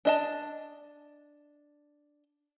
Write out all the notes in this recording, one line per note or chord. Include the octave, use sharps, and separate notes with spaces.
D4 D#5 A5